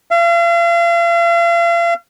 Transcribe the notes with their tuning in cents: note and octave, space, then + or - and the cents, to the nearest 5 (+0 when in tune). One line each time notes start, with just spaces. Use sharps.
F5 -40